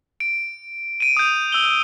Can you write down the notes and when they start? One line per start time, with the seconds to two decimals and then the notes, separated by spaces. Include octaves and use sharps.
0.20 D7
1.00 D7 D#7
1.17 D#6 G6
1.52 E6 G7